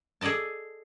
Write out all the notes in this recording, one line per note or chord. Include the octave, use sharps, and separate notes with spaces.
G#4 A4 D5 D#5 A5